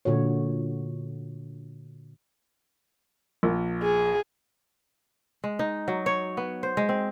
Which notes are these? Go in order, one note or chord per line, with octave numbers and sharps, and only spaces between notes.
A#2 D3 F#4 C#5
A#1
G#4
G#3
D#4
F#3
C#5
B3
C5
G#3
C4